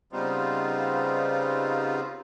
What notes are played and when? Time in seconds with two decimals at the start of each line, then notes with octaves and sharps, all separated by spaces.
0.13 C#3 G3 B3 C4 D#4 F4